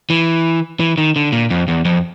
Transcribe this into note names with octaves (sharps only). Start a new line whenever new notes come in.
E3
E3
D#3
D3
A#2
F2
E2
F2